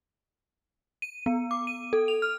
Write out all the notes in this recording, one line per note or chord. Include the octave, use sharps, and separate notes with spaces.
D#7
B3
D6
D#7
A4
F7
F6